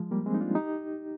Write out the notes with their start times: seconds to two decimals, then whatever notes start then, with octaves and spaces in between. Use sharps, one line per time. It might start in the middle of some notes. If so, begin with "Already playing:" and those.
Already playing: F3 G#3
0.11 G3 A#3
0.26 G#3 C4
0.34 D#4
0.41 D4 F4
0.55 D#4 G4